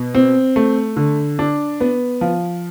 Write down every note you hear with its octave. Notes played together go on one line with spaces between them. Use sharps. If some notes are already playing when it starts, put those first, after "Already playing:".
Already playing: B2
C4
A3
D3
D4
B3
F3